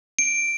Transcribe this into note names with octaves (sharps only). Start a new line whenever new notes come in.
D7